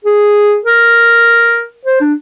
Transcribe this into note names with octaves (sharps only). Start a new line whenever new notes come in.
G#4
A#4
C5
D4